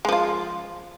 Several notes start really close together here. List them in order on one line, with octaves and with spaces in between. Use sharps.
G#3 F3 F4